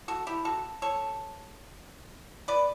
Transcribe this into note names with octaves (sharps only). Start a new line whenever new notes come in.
F#4 A4
E4 G4
F#4 A4
A4 C#5
B4 D5